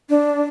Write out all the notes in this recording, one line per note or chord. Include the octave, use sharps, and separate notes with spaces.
D4